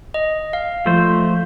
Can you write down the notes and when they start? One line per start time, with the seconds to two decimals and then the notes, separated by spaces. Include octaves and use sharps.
0.14 D#5
0.53 F5
0.86 F3 A3 C5